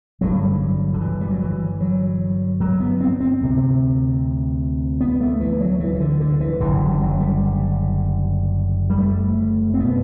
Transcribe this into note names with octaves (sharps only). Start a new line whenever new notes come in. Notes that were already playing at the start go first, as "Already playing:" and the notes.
G1 G2 D3 F#3
D3
E3
G3
F#3
E3
F#3
F#3
B3
C4
C4
D2 C3
B3
A3
E3
F#3
E3
E3
D3
D3
E3
F#1 F#2 D3 E3
F#3
G3
F#3
G3
G3
A3
C4
B2 B3